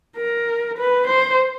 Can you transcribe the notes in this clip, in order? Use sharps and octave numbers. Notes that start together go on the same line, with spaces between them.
A#4
B4
C5